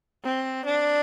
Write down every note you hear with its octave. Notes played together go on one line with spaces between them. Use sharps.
C4
D4